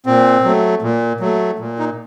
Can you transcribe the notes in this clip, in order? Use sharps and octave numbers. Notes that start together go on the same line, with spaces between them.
A#2 C4
F#3 A3
A#2
F#3 A3
A#2
D#4